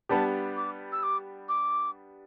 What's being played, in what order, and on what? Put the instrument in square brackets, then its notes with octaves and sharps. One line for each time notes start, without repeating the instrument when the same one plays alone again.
[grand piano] G3 B3 D4 G4 [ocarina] A5
[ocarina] D6
E6
D6
D6